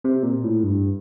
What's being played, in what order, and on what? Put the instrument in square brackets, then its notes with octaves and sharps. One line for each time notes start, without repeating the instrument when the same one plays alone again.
[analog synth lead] C3
A#2
A2
G2